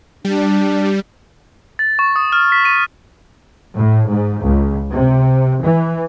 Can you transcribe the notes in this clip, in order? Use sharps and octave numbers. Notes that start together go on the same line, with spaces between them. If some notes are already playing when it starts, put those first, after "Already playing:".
G3 D4
A6
C#6
D#6
F6
B6
D#7
A2
G#2
C#2
C3
E3